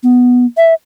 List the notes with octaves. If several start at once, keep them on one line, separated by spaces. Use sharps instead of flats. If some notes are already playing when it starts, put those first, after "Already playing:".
B3
E5